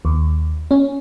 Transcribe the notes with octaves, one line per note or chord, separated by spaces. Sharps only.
D#2
C#4